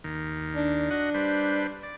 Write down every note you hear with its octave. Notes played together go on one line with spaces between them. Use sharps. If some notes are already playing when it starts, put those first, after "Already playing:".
D#2 D#3
D4
D4 F#4 D#5 F#5
G3 B4 C5
D5